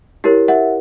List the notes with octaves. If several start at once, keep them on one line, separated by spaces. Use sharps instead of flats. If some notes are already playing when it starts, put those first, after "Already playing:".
E4 G4 A#4 C#5
E5 F#5